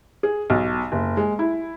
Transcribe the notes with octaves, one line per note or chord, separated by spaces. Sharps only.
G#4
B1
F#1
G#3
E4